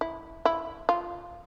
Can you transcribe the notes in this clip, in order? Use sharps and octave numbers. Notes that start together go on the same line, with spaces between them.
E4
E4
F4